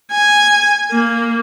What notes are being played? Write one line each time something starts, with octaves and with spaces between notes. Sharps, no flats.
G#5
A#3